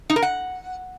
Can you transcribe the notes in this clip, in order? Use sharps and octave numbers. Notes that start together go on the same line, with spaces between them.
D#4
A#4
F#5